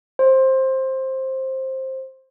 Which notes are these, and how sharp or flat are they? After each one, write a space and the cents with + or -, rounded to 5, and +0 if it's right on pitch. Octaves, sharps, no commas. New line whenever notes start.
C5 +15